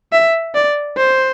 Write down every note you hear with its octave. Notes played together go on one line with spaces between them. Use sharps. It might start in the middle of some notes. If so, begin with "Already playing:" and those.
E5
D5
C5